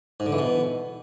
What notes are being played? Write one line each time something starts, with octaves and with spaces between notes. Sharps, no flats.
G#2
D3
E3
B2